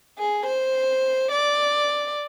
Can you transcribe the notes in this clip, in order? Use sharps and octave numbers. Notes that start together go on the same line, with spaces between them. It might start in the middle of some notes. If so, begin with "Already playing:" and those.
G#4
C5
D5